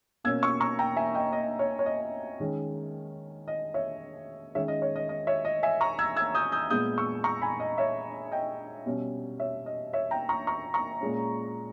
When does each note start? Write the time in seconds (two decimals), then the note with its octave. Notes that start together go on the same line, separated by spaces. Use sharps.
0.24 B2 A#3 C#4 E6 G#6
0.43 C#6 E6
0.60 A#5 C#6
0.79 G5 A#5
0.97 E5 G#5
1.15 D#5 G5
1.33 D#5
1.59 C#5
1.79 C#5
1.86 D#5
2.40 D#3 G#3 C#4
3.48 D#5
3.74 C#5 E5
4.55 D#3 G#3 C#4 C#5 E5
4.68 D#5
4.82 C#5
4.96 D#5
5.09 D#5
5.27 C#5 E5
5.45 D#5
5.63 E5 G#5
5.81 A#5 C#6
5.99 E6 G#6
6.16 E6 G#6
6.35 D#6 G6
6.52 D#6 G6
6.70 A#2 G#3 B3 D#6 G6
6.98 C#6 E6
7.24 A#5 C#6
7.42 G#5 B5
7.60 D#5
7.78 C#5 E5
8.32 D#5 G5
8.86 B2 G3 C#4
9.40 C#5 E5
9.66 D#5
9.93 C#5 E5
10.11 G5 A#5
10.29 A#5 C#6
10.47 A#5 C#6
10.74 A#5 C#6
11.01 A#2 G#3 C#4